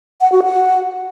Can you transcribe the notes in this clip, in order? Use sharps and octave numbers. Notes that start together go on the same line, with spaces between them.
F#5
F#4
F#5